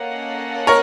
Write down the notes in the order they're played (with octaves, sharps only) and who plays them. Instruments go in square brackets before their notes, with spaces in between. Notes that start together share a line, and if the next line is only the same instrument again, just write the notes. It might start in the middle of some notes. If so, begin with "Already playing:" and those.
Already playing: [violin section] A#3 C#4 A4 D#5 F#5
[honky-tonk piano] A#4 C#5